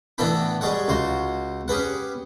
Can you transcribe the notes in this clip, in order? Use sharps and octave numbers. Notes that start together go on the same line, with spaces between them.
A2 E3 B3 D4 G5 B5
G3 G#3 G#4 C#5 F#5
C#2 F#4 C6
C#4 G4 G#4 B4 F#5